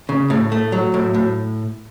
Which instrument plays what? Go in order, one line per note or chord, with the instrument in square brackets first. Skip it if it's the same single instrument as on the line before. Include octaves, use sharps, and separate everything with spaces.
[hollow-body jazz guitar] C#3
A2
A3
F#3
A2
A2